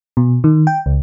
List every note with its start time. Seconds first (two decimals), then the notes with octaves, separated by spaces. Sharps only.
0.17 B2
0.44 D#3
0.67 G5
0.86 C#2